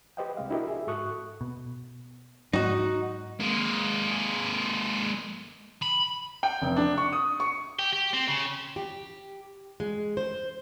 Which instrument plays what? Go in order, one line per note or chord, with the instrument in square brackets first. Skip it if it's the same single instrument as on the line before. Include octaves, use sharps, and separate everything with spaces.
[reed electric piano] G4 B4 C5 D#5 F#5 G5
C2 C3 G#3 F5
D4 E4 F#4 G4 A#4 D#5
G#4 E5
G#2 F#4 A4 C#6 D#6 F#6
[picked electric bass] B2
[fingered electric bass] G#2 [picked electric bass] F#3 [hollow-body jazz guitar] D#4 F#4
[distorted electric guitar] G#3 A#3
B5
[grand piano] G5
F1
D4
C#6
D#6
C#6
[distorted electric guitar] G4
G4
C4
C#3
[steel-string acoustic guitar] G4
G#3
C5